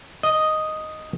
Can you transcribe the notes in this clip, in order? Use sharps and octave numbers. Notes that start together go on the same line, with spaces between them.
D#5